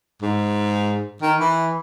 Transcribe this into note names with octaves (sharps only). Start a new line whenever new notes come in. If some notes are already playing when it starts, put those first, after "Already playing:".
G#2
D#3
E3